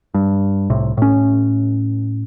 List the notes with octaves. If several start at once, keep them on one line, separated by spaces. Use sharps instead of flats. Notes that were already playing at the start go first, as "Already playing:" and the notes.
G2
C2 A2 C3
A2 C#4